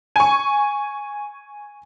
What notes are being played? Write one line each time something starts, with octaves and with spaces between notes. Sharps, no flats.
G#5 C#6